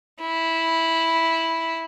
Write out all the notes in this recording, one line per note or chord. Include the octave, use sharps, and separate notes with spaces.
E4